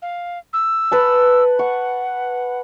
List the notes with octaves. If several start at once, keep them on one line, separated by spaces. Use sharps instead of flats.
F5
E6
B4 F#5 A5
F#5 C#6